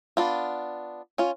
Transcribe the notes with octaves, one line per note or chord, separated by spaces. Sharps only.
B3 D4 F4
C#4 F4